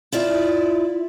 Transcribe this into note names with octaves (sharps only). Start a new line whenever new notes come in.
E4 F4 D5 E5